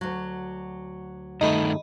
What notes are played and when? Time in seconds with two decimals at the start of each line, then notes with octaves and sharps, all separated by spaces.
0.01 D2 F#3
1.41 G2 D#3 A3 D#4 D#5 B5